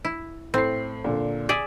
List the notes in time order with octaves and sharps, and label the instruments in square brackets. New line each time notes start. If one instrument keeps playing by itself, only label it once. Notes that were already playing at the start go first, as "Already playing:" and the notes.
[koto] E4
[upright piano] A2 C7 [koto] C4
[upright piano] A#2 D3
[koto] G#4 D5 E5